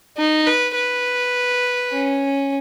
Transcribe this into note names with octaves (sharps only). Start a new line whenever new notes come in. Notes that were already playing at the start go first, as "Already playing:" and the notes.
D#4
B4
B4
C#4